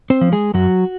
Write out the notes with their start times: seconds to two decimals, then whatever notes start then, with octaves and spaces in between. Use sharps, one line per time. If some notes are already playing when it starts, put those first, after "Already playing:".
0.10 C4 C5
0.21 F3
0.32 G#3 G#4
0.54 F#2 F#3 F#4